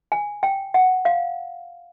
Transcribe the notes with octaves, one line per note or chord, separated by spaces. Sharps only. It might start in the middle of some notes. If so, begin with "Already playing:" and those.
G#5
G5
F#5
F5